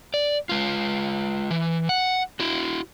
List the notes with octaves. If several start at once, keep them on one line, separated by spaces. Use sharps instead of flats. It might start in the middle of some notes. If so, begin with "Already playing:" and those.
D5
G#3 F4
E3
F#5
E4 F#4